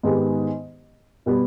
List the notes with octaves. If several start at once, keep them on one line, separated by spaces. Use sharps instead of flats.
G#2 D#3 G#3 B3 G4
B2 G3 B3 G4